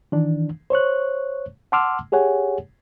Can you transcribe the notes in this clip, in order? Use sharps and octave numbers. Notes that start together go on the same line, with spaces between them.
D#3 E3 D4
C5 C#5 C#6 F#6
F#5 A5 C6 D6 E6 F6
G4 G#4 C#5 F#5 G#5